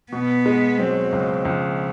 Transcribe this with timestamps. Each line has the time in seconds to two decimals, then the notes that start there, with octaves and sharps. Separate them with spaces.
0.12 B2 B3
0.46 G#3
0.79 F#3 C4
1.12 C#2
1.45 C#2 F3